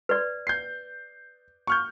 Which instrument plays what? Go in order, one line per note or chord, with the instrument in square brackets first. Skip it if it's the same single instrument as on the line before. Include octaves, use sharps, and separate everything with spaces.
[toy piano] B4 D5
[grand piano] G6 C7
C#6 F6 G6